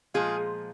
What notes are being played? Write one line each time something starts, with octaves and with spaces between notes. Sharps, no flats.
A#2 F3 G#3 F4 G#4